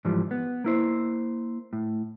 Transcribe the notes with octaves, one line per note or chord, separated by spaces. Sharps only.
G#2 E3 F3 G3
B3
A#3 E4 C5
A2